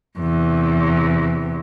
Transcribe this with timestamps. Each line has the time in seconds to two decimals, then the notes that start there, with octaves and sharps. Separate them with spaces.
0.19 E2 C3